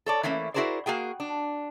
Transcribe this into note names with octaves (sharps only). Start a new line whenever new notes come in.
A4 C#5 D5
E3 A3 A#3 C#4 E4
E4 F#4 G#4 A#4 C5 D5
A#3 F#4 G#4 G5
D4